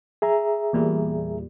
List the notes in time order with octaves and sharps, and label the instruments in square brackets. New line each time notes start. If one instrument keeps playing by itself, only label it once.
[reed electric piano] G#4 E5 A#5
[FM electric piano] E2 A#2 G3